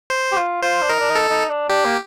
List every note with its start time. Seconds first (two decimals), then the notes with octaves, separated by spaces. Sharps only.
0.10 C5
0.32 G4
0.37 F4
0.62 F4 C5
0.82 D4
0.89 D#4 A#4
0.99 D4
1.09 D#4
1.15 A4
1.29 D#4
1.49 D4
1.69 D4 G4
1.85 A#3